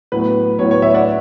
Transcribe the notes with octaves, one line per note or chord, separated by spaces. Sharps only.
A2 F#3 B3 B4
A2 F#3 B3 C#5
C#5
C#5 E5
D5 F#5